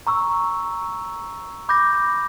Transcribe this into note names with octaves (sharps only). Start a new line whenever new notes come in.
A#5 C#6 E6
B5 D6 G6 A#6